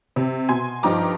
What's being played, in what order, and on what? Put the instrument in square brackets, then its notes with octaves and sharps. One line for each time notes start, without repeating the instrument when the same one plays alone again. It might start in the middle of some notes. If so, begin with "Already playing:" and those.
[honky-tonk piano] C3
B2 G#5 C6 G#6
G2 F3 D#4 G5 A#5 D6